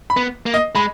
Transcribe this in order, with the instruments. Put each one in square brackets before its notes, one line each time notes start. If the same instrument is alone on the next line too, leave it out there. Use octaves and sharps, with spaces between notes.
[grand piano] B5
[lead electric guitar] B3
A#3
[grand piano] D#5
[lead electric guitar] G#3 [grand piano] B5